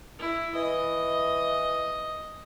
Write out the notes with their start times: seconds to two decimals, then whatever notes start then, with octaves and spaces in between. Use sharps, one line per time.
0.19 E4
0.55 E3 D#5